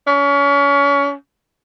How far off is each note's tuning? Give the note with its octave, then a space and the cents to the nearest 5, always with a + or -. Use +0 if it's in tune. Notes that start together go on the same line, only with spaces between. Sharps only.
C#4 +30